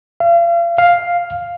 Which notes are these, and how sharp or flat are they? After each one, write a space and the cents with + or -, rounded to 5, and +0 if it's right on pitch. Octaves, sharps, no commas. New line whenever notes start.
F5 -40
F5 +0